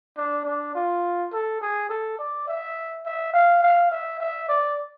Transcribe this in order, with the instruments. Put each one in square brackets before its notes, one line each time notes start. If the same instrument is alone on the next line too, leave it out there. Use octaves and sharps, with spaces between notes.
[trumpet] D4
D4
F4
A4
G#4
A4
D5
E5
E5
F5
F5
E5
E5
D5